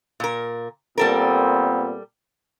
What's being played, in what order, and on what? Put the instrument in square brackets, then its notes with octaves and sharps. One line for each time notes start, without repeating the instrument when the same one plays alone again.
[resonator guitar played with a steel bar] A#2 A#4
[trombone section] A#2 B3 C4 [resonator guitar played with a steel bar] G3 A4 A#4